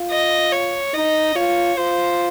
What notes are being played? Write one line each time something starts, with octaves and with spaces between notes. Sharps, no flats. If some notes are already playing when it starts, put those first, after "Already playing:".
Already playing: F4
D#5
C#5
D#4 D#5
F4 C#5
F4 C5